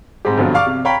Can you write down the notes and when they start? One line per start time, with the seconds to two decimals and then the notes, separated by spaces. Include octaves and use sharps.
0.25 G#2 G3 G#3 C4 G4
0.37 G2 B2 D3 F3 F#3
0.54 D5 F5 C#6 D6 F6
0.67 C3
0.85 C#5 F5 G5 A#5 B5 B6